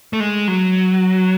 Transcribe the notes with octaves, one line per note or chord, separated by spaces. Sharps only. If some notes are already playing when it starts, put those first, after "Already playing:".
A3
G#3
F#3